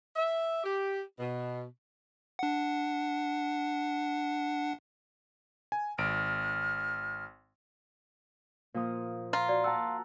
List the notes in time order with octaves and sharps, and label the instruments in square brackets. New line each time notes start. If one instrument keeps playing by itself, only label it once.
[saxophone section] E5
G4
B2
[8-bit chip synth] D4 F#5
[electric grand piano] G#5
[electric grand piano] G#1 D7 [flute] F6
[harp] A#2 F3 D#6
[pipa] F4 [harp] A#5
[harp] F#4 [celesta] D5
[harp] F#5 A5 A#5 [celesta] E6